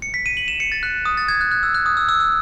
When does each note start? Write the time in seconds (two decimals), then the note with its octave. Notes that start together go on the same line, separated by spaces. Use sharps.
0.02 C#7
0.14 B6
0.26 D#7
0.37 F#7
0.48 E7
0.60 C#7
0.72 A6
0.83 F#6
1.05 D#6
1.17 A6
1.28 G#6
1.41 F#6
1.51 F#6
1.63 E6
1.74 F#6
1.86 D#6
1.97 E6
2.09 E6
2.20 E6